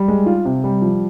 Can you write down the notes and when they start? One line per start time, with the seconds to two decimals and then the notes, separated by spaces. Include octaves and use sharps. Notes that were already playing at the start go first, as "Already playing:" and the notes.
Already playing: G3
0.08 G#3
0.26 F4
0.45 C3
0.64 G3
0.82 F3